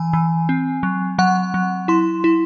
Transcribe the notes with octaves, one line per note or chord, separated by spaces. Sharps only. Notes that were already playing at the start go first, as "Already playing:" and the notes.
Already playing: E3 G#5
E3
C4
F#3
F#3 F#5
F#3
E4 C6
E4